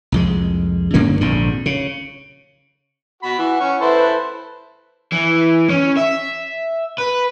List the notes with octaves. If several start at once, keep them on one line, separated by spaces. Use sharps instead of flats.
C2 F2 G#3
G2 D3 A#3 C#4
A#1 F2 G#2 D3
C#3
F#4 B5
E3 F#5
C#4
E4 A4 B4 C5
E3
C#4
E5
B4